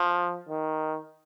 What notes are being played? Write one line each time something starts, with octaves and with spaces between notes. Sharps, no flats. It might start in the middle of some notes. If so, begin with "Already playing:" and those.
Already playing: F3
D#3